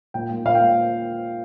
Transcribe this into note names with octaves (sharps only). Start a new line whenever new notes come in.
A#2 G5
A#3
A#2 F5
G5
A#3